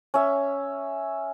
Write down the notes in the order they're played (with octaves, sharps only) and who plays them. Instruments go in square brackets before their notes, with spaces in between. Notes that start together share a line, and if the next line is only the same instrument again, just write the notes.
[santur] C#4 E5